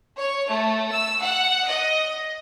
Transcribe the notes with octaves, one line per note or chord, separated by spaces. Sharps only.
C#5
A3
E6
F#5
D#5